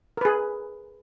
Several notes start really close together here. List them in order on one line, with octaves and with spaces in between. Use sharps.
A#4 B4 G#4